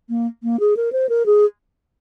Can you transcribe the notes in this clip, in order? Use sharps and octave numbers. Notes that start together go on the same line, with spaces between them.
A#3
A#3
G#4
A#4
C5
A#4
G#4